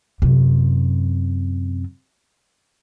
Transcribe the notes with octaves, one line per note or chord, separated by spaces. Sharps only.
F#2 C3